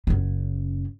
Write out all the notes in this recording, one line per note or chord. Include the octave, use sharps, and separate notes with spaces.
F#1 C#3